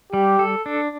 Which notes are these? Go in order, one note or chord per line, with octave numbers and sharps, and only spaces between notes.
G3 G4
A4
D4